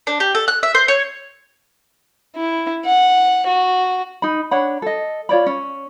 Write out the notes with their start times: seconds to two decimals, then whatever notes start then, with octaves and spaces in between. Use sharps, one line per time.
0.07 D4
0.20 G4
0.35 A4
0.48 F#6
0.63 E5
0.75 C5
0.88 C#5
2.36 E4
2.85 F#5
3.47 F#4
4.22 D#4 B5
4.51 D4 C#5 F#5 B5
4.82 A4 D#5
5.29 F4 C#5 D5 B5
5.46 C#4